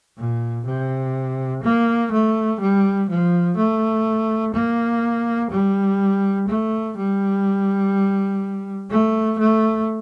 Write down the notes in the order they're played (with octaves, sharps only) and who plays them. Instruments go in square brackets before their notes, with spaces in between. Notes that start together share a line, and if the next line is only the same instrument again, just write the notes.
[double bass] A#2
C3
A#3
A3
G3
F3
A3
A#3
G3
A3
G3
A3
A3